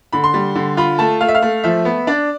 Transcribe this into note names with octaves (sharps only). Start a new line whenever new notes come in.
D3 B5
C6
G3
D3
F4 B5
A3 A5
A3 F5
E5
F5
A3
F3 E5
B3
D4 D5